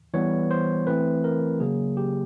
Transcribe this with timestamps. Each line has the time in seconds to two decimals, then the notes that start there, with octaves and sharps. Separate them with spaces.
0.14 E3 G3 B3 C#5
0.51 C5
0.87 E3 A3 C4 B4
1.24 A#4
1.60 C#3 F#3 A#3 G#4
1.97 G4